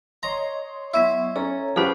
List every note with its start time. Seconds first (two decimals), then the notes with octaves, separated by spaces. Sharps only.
0.23 C#5 D#5 A#5 C6
0.94 F#3 B3 E4 C#6
1.36 C#4 A4 C#5 A#5
1.76 F3 F#3 C#4 G4 G#4 B4